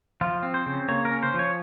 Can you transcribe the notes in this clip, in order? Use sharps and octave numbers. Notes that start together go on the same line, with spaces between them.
F3 F4
C4
C5
C#3
A#3 C#5
A#4
C#4
C5
F3
C#5